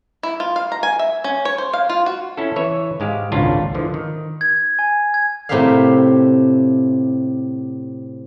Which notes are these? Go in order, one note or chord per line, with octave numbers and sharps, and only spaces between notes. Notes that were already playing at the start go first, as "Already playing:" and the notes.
E4
F4
F5
A#5
G#5
E5
C#4
C#5
C5
F5
F4
F#4
C#4 E4 A4
E3 B4 C#5 E5
G#2 G#3 G4 F5
G#1 C#2 A#2 C#4 D4 F4
D3 E3 F3
D#3
G#6
G#5
G#6
A2 C3 G4 A#4 E5 F5